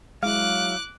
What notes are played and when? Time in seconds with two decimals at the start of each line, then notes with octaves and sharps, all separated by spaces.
0.23 F#3 G#3 E4 F5 D6 F#6